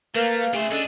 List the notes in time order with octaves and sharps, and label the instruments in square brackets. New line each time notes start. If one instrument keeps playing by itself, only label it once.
[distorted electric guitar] A3 [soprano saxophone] A#3 [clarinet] A#4 [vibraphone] B4 F5
[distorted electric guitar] C#3 C5 [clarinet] A3 [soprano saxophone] G#4
[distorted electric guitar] C#2 D4 [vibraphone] C#4 D#5 [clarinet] A4